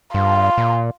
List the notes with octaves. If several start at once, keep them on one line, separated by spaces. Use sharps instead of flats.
G2 F4
A#2